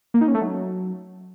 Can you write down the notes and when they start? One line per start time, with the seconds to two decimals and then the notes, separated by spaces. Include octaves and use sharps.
0.14 A#3
0.21 D#4
0.28 C#4
0.34 A3
0.41 F#3